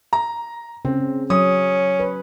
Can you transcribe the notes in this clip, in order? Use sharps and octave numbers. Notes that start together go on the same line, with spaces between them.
A#5
C#3 C4
F#3 C#4 D#6
B4